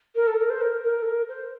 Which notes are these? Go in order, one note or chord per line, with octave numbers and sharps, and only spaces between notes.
A#4
A4
A#4
C5
A#4
A#4
A4
A#4
C5